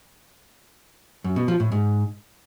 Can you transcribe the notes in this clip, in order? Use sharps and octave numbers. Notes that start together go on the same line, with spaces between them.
F#2
B2
F3
A2
G#2